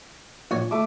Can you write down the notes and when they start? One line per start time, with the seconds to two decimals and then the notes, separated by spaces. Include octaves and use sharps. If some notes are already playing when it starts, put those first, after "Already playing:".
0.51 A#1 C#5 G#5
0.71 A3 D6